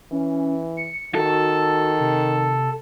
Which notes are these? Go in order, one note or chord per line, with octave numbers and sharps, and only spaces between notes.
E3 C#4
C#7
D#3 F#4 A4
C3